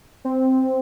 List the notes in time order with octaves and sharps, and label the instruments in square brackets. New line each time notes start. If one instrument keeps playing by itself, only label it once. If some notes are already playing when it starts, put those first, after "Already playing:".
[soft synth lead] C4